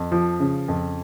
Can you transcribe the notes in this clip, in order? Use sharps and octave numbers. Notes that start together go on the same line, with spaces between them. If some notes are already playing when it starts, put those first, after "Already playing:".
Already playing: F2
F3
C#3
F2